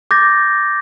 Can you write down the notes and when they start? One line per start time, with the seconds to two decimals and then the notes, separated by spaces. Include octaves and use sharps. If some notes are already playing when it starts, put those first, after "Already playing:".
0.11 D6 G6 A6 A#6